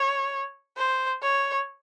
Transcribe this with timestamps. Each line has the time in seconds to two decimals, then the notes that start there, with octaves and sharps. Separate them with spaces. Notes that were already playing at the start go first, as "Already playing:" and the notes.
Already playing: C#5
0.78 C5
1.23 C#5